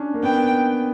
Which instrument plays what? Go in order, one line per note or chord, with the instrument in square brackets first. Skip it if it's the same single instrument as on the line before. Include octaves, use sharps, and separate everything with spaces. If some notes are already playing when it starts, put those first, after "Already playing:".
Already playing: [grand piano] C#4 D4
A#3
[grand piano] B3 [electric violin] G5